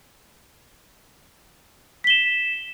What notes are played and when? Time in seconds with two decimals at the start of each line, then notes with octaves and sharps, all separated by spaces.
2.04 B6
2.07 G7
2.10 E7